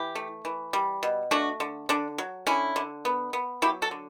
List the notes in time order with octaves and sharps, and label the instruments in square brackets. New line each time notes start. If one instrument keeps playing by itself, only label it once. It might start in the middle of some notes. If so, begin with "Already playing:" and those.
Already playing: [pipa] E3 E4 G4
A3
E3
G3
B2
A3 D4 F#4
D3
D3 D4
F#3
D3 C#4 E4
D3
B3
B3
F#3 E4 G4
F#4 A4
D3